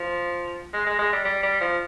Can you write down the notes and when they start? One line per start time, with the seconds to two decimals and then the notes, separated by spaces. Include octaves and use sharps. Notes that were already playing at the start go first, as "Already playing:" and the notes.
Already playing: F3
0.74 G#3
0.86 G#3
0.98 G#3
1.13 G3
1.25 G3
1.43 G3
1.61 F3